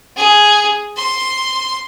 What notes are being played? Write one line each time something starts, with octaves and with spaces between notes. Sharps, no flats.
G#4
C6